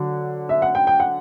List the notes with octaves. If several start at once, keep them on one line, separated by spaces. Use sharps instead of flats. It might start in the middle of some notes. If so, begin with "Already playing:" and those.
Already playing: D3 F#3
E5
F#5
G5
G5
F#5